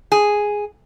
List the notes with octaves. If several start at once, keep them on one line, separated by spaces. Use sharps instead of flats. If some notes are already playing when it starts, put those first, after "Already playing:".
G#4